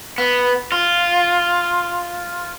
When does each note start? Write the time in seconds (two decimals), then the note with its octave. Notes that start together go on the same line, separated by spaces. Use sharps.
0.18 B3
0.72 F4